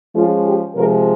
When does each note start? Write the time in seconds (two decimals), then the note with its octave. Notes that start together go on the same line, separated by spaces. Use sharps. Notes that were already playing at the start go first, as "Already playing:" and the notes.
0.15 F3 G#3 C#4 F4
0.45 G4
0.75 C3 F3 G#3 A#4